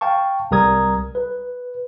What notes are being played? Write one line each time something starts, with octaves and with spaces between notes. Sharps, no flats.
F5 G5 A5 C#6
C2 G3 A#4 A#5 D#6 G#6
B4